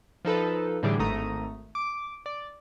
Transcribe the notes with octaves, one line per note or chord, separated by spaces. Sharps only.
F3 D#4 A4 B4
A2 D3 E3 G3 G4 G#4
G#1 A3 A#5 D#6
D6
D5